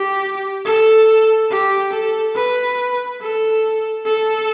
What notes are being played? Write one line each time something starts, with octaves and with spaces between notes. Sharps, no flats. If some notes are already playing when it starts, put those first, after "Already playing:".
Already playing: G4
A4
G4
A4
B4
A4
A4